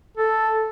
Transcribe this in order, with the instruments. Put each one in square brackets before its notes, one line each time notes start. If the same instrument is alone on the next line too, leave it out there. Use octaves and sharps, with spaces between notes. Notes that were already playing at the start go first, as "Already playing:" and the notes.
[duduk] A4